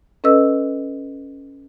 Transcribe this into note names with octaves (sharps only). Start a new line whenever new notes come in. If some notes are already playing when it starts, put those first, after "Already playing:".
C#4 A4 B4 D#5 E6